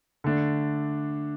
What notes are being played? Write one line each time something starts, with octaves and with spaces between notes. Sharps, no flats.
D3 A3 D4